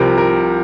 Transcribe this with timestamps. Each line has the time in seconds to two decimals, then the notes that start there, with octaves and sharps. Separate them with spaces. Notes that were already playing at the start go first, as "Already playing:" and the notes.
Already playing: C2 C3 F3 A#4
0.18 A#4